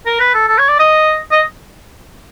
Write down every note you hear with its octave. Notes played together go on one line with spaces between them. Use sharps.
A#4
B4
A4
A4
C#5
D5
D#5
D#5